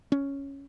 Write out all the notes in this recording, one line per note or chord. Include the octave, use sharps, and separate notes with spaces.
C#4